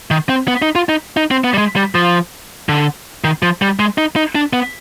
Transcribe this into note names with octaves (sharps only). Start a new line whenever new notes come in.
D#3
C4
B3
D#4
F4
D#4
D#4
C4
B3
G3
G#3
G3
F3
D3
D#3
F3
G3
G#3
D#4
D#4
D4
B3